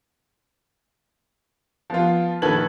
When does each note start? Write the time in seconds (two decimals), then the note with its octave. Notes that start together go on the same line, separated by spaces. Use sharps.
1.90 F3 B3 F4
2.42 A#1 D#3 A4 B4 G#6 F#7